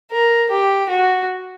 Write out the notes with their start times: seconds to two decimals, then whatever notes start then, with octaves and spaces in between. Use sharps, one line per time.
0.11 A#4
0.50 G4
0.89 F#4